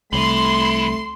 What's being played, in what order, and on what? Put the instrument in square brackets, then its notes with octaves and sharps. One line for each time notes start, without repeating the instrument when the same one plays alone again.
[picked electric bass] C2 [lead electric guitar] E3 [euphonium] A3 [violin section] C6